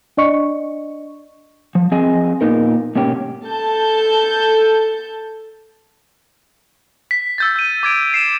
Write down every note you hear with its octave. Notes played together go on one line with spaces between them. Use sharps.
D4 D5 D#5 C#6 C#7
F3
F3 C4 G#4 D#5 G#5
A#2 C#3 B3 D#4 A#4
G#2 B2 A#3 C#4 G4
A4 A5 G6
B6
E6 G6 A6
G6 D#7
D6 G#6 D7
C7 D#7 E7